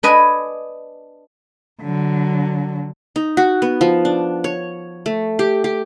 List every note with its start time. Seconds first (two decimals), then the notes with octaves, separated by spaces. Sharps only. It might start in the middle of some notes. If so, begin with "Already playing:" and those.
0.03 D4 B4 D#5 G#5
1.81 D3 F#3
3.16 D#4
3.37 F#4
3.62 B3
3.81 F3
4.05 D4
4.44 C#5
5.06 A3
5.39 G4
5.64 G4